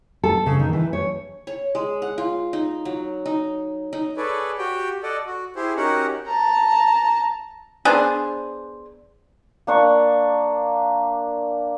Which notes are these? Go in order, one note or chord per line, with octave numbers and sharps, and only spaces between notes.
A4
C#3
D#3
E3
C#5
C#5
G#3
F#5
F4
D#4
F#3
D#4
D#4
G#4 A4 B4 C#5 D5
F#4 G4 G5
A4 D5 D#5 F#5
F#4
E4 G4 G#4 C5
C#4 D#4 F#4 G4 A#4 F#5
A5 A#5
B3 D4 G#4 C5
A#3 D4 C#6